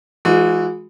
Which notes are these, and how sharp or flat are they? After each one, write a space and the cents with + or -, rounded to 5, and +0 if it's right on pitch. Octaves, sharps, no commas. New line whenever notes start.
E3 +0 G#3 +0 F#4 -40